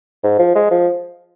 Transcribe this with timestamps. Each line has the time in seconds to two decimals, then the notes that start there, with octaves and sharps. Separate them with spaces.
0.23 G#2
0.39 F3
0.55 G#3
0.71 F3